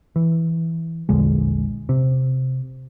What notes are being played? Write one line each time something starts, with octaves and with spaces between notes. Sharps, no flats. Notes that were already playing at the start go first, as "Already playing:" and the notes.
E3
A#1 E2 D3 G#3
C3